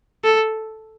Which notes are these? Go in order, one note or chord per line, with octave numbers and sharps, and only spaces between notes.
A4